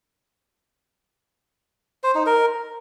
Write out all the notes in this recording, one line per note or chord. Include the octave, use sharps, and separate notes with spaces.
C5
D#4
A#4